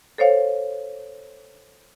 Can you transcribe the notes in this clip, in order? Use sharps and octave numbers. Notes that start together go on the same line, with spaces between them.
A4 C5 C#5 F5